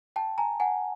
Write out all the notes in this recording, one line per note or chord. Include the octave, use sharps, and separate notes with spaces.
G5 A5
G#5 A#5
F#5 G#5